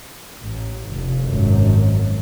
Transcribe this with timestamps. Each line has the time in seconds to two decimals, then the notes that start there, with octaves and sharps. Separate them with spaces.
0.42 A1
0.90 F1
1.23 G#1 F#2